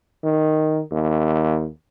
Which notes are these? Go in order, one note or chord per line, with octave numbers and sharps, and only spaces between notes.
D#3
D#2